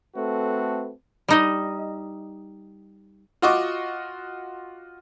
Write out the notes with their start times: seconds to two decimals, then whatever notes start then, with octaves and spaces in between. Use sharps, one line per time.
0.16 A3 C4 F#4 A4 B4
1.28 G3 D#4 D#5
3.42 F4 F#4 D#5 C#6 D6